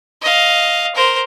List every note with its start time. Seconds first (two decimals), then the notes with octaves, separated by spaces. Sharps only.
0.22 D#5 F5
0.95 A#4 C5